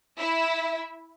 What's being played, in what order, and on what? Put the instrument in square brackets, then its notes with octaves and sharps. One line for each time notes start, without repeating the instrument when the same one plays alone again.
[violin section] E4 E5